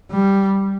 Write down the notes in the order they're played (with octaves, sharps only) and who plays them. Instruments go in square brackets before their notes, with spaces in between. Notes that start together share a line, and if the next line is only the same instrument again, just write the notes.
[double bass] G3